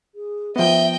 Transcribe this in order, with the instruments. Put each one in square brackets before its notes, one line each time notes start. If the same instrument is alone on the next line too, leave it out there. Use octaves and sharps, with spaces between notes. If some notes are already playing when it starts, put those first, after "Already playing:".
[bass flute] G#4
[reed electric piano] F3 B3 [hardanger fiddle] D#5 G5 [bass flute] E5